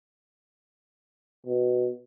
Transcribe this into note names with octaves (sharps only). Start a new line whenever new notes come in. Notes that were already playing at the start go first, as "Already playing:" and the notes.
B2